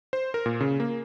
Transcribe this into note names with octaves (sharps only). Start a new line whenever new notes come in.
C5
A#4
A#2
C#3
A#3